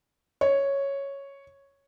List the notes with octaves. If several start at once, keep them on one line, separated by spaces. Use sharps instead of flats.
C#5